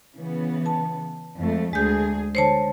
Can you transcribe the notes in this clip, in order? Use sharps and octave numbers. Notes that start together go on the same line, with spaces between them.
C#3 E3 B3
A5
F2 G#3 A3
D2 G#3 G#4 G6
D3 C5 C#5 A5